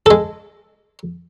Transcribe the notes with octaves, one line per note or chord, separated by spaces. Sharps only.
G#3 A4